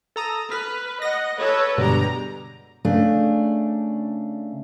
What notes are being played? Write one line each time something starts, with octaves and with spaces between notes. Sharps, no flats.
A4 A#5 D#6
B4 F6 B6
D#5 F#5 A#6
A4 B4 C#5
G2 B2 D3 G#3 G4 A#5
C#3 A3 D4